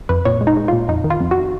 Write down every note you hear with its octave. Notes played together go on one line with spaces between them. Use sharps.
F2 B4
A#2 C#5
G#3
D#4
G#3
A#2 F4
F2 D#4
D#3
F4
F2
F#4